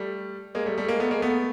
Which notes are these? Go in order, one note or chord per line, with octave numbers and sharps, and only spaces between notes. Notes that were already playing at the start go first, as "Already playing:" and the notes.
Already playing: G3 A3
G#3 A#3
G3 A3
G3 A3
G#3 A#3
A3 B3
G#3 A#3
A3 B3